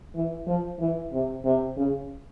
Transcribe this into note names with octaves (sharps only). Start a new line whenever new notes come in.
E3
F3
E3
C3
C3
C#3